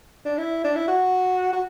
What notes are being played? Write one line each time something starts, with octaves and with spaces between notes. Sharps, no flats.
D4
E4
D4
E4
F#4
F#4